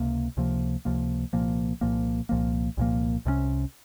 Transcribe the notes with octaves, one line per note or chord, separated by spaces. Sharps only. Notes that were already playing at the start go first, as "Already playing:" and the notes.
Already playing: C#2 C3 A#3
C#2 C3 F3 A#3
C#2 C3 F3 A#3
C2 A#2 F3 A#3
C2 A#2 F3 A#3
C2 A#2 F3 A#3
C2 A#2 F3 A#3
C2 C3 G3 C#4